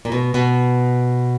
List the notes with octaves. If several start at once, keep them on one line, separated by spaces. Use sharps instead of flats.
A#2
B2
B2